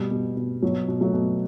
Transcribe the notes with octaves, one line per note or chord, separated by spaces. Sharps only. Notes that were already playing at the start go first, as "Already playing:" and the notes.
Already playing: B2 G3
B2
B2
B2 F#3
B2
F#3 A3
B2